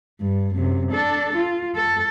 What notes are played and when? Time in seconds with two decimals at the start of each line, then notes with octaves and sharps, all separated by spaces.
0.21 G2
0.55 F#2 C3
0.91 D4 A4
1.36 F4
1.75 A4